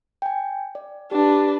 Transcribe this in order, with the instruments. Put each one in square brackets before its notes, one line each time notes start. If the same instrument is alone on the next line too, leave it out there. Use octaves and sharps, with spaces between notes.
[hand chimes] G5 G#5
D5
[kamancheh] D4 B4 [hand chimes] G4